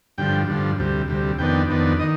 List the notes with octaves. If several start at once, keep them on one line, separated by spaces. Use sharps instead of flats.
G2 D3 F3 G5
G2 D3 F3
D2 C3 G3
D2 C3 G3
F2 D#3 B3 D4 G5
F2 D#3 B3 D4
D#3 D#5